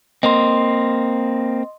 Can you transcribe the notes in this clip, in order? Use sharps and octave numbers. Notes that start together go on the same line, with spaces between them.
A#3 C4 D#5 C6